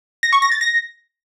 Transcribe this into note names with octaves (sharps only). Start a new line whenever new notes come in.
A#6
C#6
A#6
A6
A#6